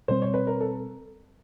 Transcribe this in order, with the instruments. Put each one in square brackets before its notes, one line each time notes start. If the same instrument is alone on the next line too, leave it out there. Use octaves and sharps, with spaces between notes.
[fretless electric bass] B2 G3 C4 [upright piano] C5
[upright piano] C#5
B4
A#4
A4